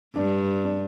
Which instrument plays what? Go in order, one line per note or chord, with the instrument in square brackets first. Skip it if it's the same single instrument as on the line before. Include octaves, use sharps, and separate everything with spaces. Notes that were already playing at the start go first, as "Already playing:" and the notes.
[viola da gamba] G2 [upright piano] D4
[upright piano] D4